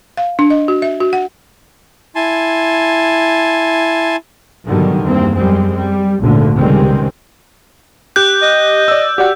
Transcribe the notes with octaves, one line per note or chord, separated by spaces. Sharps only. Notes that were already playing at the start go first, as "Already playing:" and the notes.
F5
D4
D#5
F#4
E5
F#4
F#5
E4 G#5 A5 C6
G#2 B2 D3 D#3 F#3 G3
E2 G2 A#3 C4
F#2 G3 G#3 C4
G3
G#1 D2 A#2 D3
C#2 C3 D#3 G3 G#3 C4
G4 F#6 G6
D#5
D5 E6
F#4 G4 D5 F#5